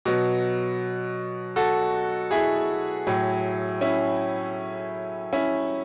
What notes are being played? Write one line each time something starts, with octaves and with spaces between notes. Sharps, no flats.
B2 F#3
F#4 A4
E4 G#4
A2 F#3
C#4 E4
C#4 E4